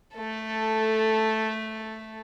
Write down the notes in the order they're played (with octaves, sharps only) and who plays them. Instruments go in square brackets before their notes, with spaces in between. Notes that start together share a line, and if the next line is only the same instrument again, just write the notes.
[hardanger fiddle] A3 A4